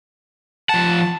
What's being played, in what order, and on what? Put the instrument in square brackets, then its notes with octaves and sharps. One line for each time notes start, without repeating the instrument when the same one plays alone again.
[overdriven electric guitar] F3 F#5 [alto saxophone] A5